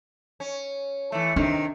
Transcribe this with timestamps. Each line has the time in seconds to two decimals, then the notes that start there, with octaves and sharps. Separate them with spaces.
0.40 C#4
1.12 E3 A3
1.36 C3 D#3 D4